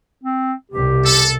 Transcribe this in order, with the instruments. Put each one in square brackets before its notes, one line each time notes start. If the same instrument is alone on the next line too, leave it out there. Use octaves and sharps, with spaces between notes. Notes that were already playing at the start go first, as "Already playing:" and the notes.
[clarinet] C4
[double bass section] C2 B2 [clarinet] G4
[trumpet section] A4